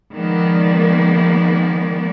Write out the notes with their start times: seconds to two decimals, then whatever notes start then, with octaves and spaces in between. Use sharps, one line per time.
0.14 D#3 F3 G#3 A#3 B3 D5